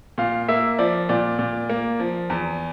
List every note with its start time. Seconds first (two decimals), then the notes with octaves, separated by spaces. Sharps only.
0.18 A#2 F5
0.48 A#3 E5
0.79 F3 D5
1.09 A#2 D5
1.39 A#2
1.70 A#3
2.00 F3
2.30 E2